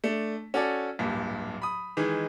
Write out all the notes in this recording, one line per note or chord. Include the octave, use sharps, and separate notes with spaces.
A3 D4
C#4 F#4 A4 D5
D1 G2 A#2
B5 D#6
D#3 E3 G#3